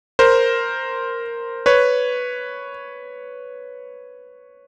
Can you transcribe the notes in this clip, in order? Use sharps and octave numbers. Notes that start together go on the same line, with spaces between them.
A#4 C5
B4 C#5